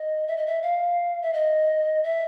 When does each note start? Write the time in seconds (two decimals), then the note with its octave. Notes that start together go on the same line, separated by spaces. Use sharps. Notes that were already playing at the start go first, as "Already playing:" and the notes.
Already playing: D#5
0.27 E5
0.37 D#5
0.47 E5
0.62 F5
1.22 E5
1.33 D#5
2.03 E5